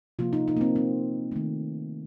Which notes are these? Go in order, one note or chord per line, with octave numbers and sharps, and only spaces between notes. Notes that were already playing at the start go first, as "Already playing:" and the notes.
C3 F3 A#3 F4
D#4
D#4
A#3
C4
C4
D#3 A3